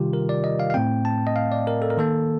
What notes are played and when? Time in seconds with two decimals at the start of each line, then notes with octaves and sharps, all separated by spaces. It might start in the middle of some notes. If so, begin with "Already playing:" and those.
Already playing: C3 D#3 G3 F4 G4
0.13 A#4
0.29 D5
0.44 D#5
0.60 F5
0.70 F5
0.74 A2 A3 C4 G5
1.05 A5
1.27 D#5
1.36 F5
1.52 D5
1.67 A#4
1.82 A4
1.90 A#4
1.97 D#3 A#3 A4